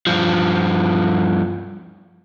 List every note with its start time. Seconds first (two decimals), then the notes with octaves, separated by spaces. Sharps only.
0.07 G2 F3